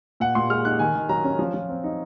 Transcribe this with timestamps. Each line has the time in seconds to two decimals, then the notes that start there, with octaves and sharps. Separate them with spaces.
0.20 A#2 F#5
0.35 A#2 C6
0.50 G#3 F6
0.65 D#4 F#6
0.79 D#3 G#5
0.95 D#3
1.09 F#3 A#5
1.24 C#4
1.39 F3
1.54 F3
1.69 C4
1.84 D#4